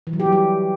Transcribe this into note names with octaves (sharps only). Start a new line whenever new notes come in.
E3
F#3
G4
G3
G4